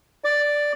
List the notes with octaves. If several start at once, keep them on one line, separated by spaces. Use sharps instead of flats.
D5